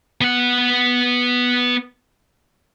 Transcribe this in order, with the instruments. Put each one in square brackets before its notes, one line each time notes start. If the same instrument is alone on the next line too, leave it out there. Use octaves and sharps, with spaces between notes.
[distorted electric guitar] B3 F#5